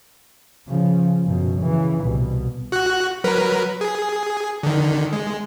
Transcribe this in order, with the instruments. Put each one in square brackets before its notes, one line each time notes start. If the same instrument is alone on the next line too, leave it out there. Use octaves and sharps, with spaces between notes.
[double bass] C#3 F3
F#2 B2
C#3 E3
C2 B2
[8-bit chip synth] F#4 F#6
F#3 A#4 B4
G#4
D3 D#3
G#3